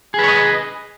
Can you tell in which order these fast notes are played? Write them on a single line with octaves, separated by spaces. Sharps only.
G#4 B4 C#5 D#5